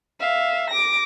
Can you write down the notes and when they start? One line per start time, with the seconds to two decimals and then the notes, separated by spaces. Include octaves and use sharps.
0.20 E5 F5
0.70 D6 A#6